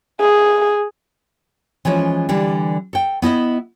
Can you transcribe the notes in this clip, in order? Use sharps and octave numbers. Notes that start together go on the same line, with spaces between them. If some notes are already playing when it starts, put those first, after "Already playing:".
G#4
E3 F3 G#3 C#4
D3 E3 G3
A4 G5
B3 E4 D#5 E5